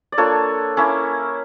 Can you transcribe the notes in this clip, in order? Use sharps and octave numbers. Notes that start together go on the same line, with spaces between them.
D5
A#3 D4 F4 A4 C#5
A#3 C#4 E4